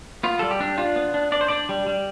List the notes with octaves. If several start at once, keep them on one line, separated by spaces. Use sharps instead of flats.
B3 F4
G3 A4
G4
D4
D4 F4
B3
D4
D4 D5
C5
D4 D5
G3
G3